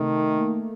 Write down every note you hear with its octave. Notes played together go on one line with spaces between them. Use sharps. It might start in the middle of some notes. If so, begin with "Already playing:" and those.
Already playing: C3 D#3 A3
A3
A#3